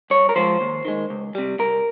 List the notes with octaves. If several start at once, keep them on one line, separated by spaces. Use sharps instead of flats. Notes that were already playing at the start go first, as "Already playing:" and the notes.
G2 C#5
A#4
F3 G#3 C5
D#2
D#3 G#3
C#2
C3 G3
C2 A#4